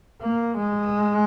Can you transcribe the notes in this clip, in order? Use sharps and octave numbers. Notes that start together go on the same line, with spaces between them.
A#3
G#3